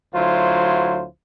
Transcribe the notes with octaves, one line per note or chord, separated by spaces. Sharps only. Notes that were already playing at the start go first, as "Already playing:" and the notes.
D2 F#3 E4 F4 C5